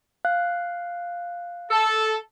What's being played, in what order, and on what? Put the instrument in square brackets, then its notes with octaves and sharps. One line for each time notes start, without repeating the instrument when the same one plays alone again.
[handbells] F5 F#6
[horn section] A4